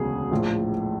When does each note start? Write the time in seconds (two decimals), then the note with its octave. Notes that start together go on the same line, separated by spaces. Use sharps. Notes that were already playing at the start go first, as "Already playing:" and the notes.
Already playing: E1 D2 C#3 F#3 B3 G#4
0.31 A#1 A2 F3